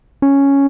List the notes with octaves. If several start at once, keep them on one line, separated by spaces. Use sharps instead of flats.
C#4